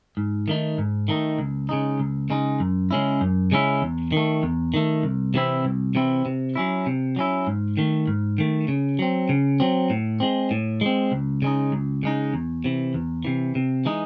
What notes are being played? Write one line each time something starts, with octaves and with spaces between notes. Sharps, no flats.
G#2
D#3 A3 D#4
G#2
D#3 A3 D#4
C#2
C#3 G#3 D#4
C#2
C#3 G#3 D#4
F#2
C#3 G#3 C#4 E4
F#2
C#3 G#3 C#4 E4
E2
D#3 A3
E2
D#3 A3
C2
C3 E3 C4 E4
C2
C3 E3 C4 E4
C3
F#3 C#4 E4
C3
F#3 C#4 E4
G#2
D#3 A3
G#2
D#3 A3
C#3
F#3 C4
C#3
F#3 C4
A2
G#3 C4
A2
G#3 C4
C#2
C#3 G#3 D#4
C#2
C#3 G#3 D#4
E2
C3 E3
E2
C3 E3
C3
E3 G#3 D#4